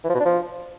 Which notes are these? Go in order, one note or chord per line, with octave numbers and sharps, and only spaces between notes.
E3
F3
B2
D4
F3